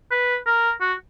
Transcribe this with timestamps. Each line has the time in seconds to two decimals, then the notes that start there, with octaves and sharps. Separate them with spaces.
0.11 B4
0.46 A#4
0.81 F#4